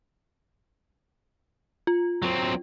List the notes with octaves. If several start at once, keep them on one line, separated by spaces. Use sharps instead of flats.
F4
F#3 C4